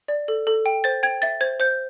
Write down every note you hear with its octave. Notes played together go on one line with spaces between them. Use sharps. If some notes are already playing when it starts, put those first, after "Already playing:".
D5
A4
A4
G5
C5 A6
G5 G#6
E5 A6
C5 G#6
C5 G6